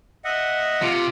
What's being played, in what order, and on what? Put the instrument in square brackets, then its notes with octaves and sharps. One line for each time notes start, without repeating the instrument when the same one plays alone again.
[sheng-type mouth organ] D#5 E5 F#5
[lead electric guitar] C3 [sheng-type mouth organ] F4